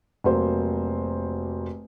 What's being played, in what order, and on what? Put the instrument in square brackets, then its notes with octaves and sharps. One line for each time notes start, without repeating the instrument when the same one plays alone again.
[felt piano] F1 F#3 A#3 C5